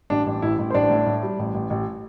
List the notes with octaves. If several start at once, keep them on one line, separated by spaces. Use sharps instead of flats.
A1 D4
A1
A1 E4
A1
C5
A1 D4 D5
A2
A2
G3
A1
A1
A1